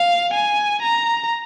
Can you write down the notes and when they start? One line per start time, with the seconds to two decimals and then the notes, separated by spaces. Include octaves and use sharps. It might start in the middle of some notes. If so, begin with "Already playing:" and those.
Already playing: F5
0.34 G#5
0.83 A#5